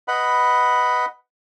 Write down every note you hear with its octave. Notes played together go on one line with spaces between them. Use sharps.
B4 D#5 F#5 B5